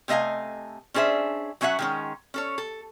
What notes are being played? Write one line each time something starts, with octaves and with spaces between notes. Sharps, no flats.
C3 A3 D#5 F5 G#5
C#4 D4 G#4 C5 E5
F#3 C#4 F#4 E5 F#5
D#3 G#3 C#4
C#4 A4 C#5
A4